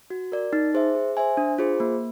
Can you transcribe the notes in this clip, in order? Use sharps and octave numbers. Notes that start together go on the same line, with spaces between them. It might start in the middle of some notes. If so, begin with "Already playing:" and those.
F#4
A#4 D5
D#4
G#4 C5 E5
G#4
C5 E5 G#5
D4
F4 G#4 C5
A#3